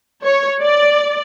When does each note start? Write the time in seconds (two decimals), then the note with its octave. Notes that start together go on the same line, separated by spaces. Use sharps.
0.24 C#5
0.62 D5